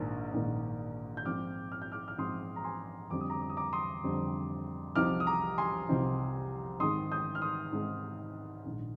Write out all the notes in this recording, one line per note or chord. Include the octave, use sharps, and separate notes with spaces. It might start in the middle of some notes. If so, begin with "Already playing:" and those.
Already playing: A#1 G#2 D#3 A#3
A#1 G#2 D#3 A#3
G6
G#2 F3 C4 D6 F6
F6
G6
D6 F6
F6
G#2 F3 C4 C6 D#6
A#5
G#5 C6
F2 D3 G3 C4 D6
D#6
A#5 D6
D6
D#6
A#5 D6
C6 D#6
F2 D3 G3 C4
C2 C3 F3 C4 D#4 D6 F6
D#6
A#5 D6
G#5 C6
C2 C3 F3 C4 D#4
G#2 D#3 G#3 C4 C6 D#6
D#6 G6
F6
C6 D#6
G#2 D#3 G#3 C4
A#1 G#2 D#3